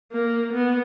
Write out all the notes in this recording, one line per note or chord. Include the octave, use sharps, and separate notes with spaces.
A#3
B3